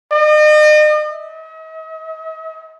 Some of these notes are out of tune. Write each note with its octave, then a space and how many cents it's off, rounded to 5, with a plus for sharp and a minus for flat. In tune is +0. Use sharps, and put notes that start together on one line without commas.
D#5 -40
D#5 +45